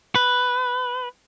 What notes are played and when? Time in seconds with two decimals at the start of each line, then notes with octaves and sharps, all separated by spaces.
0.15 B4